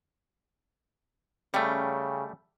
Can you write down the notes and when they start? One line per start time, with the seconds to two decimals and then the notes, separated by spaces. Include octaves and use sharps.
1.54 C#3 G3 A3 C#4 G5